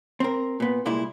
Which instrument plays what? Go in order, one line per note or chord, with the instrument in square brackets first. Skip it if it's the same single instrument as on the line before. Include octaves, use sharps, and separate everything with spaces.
[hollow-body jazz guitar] C4 A#4
A#2 B3
C2 A#2 G#3 E4